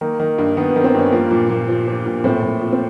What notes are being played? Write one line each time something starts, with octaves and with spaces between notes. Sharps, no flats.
D#3 A#3
D#3
G2
D#3 B3
B3
D#3
C4
G2 C#4
F3 A#3
A#2
A#2
F3
F3
A#2
A2 C4
A2
F3
C4